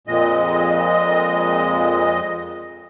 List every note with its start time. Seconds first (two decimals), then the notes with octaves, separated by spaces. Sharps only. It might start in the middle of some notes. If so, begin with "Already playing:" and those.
0.07 F2 A#2 G#3 D#5